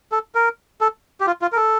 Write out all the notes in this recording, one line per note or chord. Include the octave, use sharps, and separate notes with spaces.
A4
A#4
A4
G4
F4
F4
A#4
A4